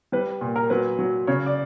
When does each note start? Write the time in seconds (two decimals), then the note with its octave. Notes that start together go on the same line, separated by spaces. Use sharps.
0.12 G3 B4
0.41 A#2
0.56 A#4
0.70 F#3 B4
0.99 F#3
1.27 C#3 C#5
1.46 D5